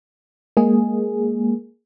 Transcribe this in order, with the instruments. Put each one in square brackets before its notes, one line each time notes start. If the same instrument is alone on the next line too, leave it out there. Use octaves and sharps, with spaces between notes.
[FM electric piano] G#3 A#3 G#4